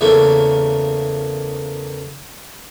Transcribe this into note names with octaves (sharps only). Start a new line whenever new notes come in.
E2 C#3 A3 A#3